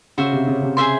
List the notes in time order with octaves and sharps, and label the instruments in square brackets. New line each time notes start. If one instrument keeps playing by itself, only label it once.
[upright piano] C#3 [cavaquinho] F#4 C5 E5
[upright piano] C3
C#3
C3
[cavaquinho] G#4 C5 E5 C6